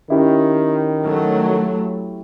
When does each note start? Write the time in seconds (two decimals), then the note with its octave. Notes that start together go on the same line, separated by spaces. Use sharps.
0.10 D#3 C#4 E4 G4
1.04 F#3 A3